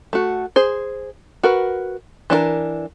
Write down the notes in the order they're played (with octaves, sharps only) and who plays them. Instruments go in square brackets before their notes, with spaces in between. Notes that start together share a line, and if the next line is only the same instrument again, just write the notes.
[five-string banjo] A3 F#4
G#4 C5
F#4 A#4 B4
E3 D4 F#4 A#4